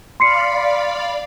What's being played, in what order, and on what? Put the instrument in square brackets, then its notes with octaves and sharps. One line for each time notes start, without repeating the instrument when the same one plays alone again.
[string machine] D5 F5 B5 [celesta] C6 C7 C#7